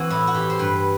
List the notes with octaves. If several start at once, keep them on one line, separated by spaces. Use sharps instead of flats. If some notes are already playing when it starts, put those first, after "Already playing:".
Already playing: E3 C4 F#4
A2 E4
F#4
E3 G4
C5
G2 B4